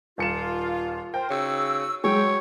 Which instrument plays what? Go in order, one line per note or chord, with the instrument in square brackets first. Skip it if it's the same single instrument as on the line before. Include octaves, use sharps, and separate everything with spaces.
[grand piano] D#1 C#7 E7 [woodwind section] F4
[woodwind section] A#4 C5 [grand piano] G5
[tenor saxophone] C#3 [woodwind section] D#4 F#4 E6
[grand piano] F#3 [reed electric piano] G#3 G#4 [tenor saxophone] C#5 [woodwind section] G5